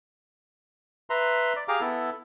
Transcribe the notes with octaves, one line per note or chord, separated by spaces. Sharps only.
B4 E5 A#5 C6
D5
G4 G#4 F5 A#5 D6
B3 E4 A4